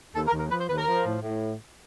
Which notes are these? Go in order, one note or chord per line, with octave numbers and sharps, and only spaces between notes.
D#2 A4
A#4
D#2
A#4
F3 B4
C5
D#2 B4
A#4
F3
A2
A2